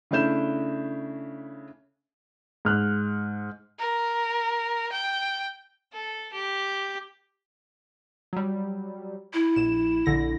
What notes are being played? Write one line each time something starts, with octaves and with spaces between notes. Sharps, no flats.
C#3 A3 D4 E4 G6 E7
G#2 F6 F#6
A#4
G5
A4
G4
F#3 G3
E4
A#1 E7
A#1 D3 A#6